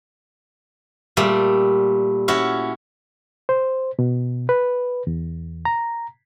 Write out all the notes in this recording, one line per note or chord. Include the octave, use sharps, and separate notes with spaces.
A#2 G3 A3
C#4 E4 F#4
C5
B2
B4
E2
A#5